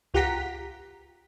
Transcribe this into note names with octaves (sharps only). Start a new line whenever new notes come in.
C#2 F4 G4 F#5 A#5 B6